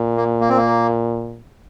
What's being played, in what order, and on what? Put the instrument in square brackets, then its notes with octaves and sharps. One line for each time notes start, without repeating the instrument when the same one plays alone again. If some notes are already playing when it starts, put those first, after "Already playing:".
Already playing: [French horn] A#2
[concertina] A#3
A#3
C4
A#3